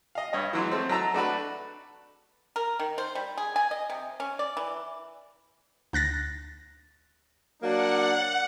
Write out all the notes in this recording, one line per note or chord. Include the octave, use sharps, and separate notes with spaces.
D#5 F5
G2 C#5 D#5
E3 F#3 G#3
A3 C4
F#3 D#4 A5 A#5 E6
A3 D4 F#4 B4
A#4
D#3
C5
G3
G#4
G#5
D#5
C3
C#4
D5
E3
D2 F#6 A6 A#6
F#3 A#3 D4 F#5